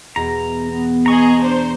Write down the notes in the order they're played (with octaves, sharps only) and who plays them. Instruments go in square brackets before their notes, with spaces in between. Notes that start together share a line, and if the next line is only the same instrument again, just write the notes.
[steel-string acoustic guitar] E2 B2 [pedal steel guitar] A#5
[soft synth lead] B3
[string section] G#4 D#5 [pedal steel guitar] A#5 C#6
[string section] D4 C5